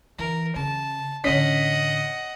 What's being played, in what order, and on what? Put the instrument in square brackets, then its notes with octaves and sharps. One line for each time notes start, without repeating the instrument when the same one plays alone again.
[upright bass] E3 [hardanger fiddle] A#4
[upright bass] C#3 [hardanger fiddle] A5
[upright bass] A1 D3 [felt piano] C#4 B6 [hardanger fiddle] D#5 F#5